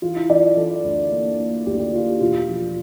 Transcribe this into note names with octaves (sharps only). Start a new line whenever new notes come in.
E3 F4
E4
E3 D5
E3 A4
D2
A#3
A#3
D2 G4
G4
A#3 F4
E1 F4
F3